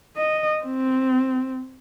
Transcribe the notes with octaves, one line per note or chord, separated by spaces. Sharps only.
D#5
C4